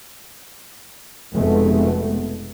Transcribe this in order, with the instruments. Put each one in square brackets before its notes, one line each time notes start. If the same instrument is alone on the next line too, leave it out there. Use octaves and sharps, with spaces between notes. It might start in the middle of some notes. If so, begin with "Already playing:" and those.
[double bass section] F1 B2 G#3 A3 B3